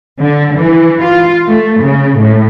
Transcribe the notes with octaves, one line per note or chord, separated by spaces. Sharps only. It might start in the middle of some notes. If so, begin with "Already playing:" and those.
D3
E3
F4
A3
C#3
A2